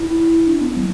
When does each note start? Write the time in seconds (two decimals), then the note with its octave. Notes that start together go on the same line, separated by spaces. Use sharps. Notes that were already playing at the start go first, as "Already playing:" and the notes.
Already playing: E4
0.47 D4
0.61 B3
0.76 F#3